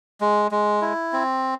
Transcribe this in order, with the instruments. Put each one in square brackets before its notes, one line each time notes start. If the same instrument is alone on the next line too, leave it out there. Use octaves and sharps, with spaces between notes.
[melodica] G#3
G#3
E4
C4